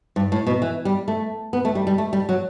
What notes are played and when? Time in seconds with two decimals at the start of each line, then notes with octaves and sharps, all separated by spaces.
0.16 G2
0.32 A2
0.47 B2
0.62 E3
0.85 G3
1.08 A3
1.53 B3
1.65 A3
1.75 G3
1.87 G3
1.98 A3
2.13 G3
2.29 F#3